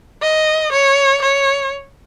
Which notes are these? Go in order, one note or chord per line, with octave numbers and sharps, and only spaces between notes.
D#5
C#5
C#5